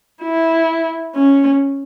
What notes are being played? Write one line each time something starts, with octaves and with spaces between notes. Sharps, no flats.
E4
C#4